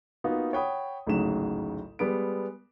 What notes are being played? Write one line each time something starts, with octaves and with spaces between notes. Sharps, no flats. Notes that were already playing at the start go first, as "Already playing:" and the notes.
A#3 B3 D#4 F4 F#4
C#5 F#5 G5 B5 D#6
A1 D2 G#2 C#3 F#3 E7
G3 G#3 B3 D7